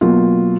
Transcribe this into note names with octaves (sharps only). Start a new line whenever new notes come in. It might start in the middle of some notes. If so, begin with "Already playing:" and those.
B2 F#3 A#3 F4